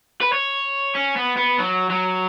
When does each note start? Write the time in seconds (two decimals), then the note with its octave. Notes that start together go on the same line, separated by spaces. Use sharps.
0.21 B4
0.32 C#5
0.95 C#4
1.17 B3
1.37 B3
1.59 F#3
1.90 F#3